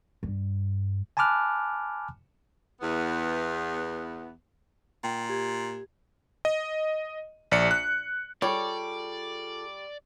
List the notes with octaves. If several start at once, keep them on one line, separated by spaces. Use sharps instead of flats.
G2
G#5 A5 B5 D6 F6 F#6
E2 B3
A#2 G5
G4 G#6
D#5
A#1 D5 C#7
F#6
G3 F4 G#4 A4 C#5 D5